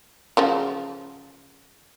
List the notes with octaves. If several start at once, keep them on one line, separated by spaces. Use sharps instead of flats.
C#3 F3 F#3